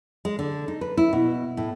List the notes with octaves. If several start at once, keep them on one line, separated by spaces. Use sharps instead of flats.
G#3
D3
D#4
B4
E4
B2
A2